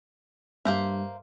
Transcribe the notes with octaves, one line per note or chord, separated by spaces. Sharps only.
G2 A#3 C5 E5